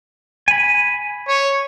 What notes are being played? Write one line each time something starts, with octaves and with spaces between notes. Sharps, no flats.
G#5 B5
C#5